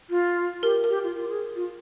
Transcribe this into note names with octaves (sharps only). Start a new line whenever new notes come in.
F4
G4 A#4
A#4
G4
F4
F4
G#4
F4